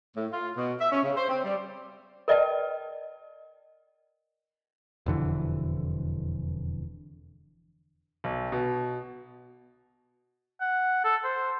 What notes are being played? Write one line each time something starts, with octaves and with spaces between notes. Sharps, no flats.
A2
F4
B2
E5
C#4
C#3
C5
C4
G3
A#4 B4 D5 D#5 G5 A5
E1 F2 D3 E3
B1
B2
F#5
A4
C5